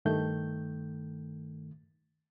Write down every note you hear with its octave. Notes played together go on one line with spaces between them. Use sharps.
G2 D#3 A3 G6